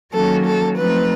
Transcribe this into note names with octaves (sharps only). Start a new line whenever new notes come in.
D#3 F#3 A#3 C#4 A4
A4
F3 A3 C4 D#4 B4